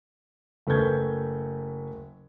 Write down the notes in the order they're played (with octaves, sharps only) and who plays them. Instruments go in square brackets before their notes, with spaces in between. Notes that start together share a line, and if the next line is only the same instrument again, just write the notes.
[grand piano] F#1 A3 B4 C#6 G6 G#6